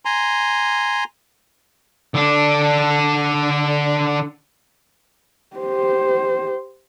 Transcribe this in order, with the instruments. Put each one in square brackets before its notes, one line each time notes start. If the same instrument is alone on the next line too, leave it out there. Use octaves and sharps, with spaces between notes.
[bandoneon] G#5 A#5 C6
[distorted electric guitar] D3 D4
[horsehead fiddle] G4 C5